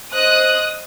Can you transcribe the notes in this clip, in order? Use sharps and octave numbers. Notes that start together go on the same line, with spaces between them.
C5 D#5 D#6 F#6